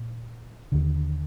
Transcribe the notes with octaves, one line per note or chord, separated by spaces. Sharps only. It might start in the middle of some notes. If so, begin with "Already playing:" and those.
Already playing: A#2
D#2 D3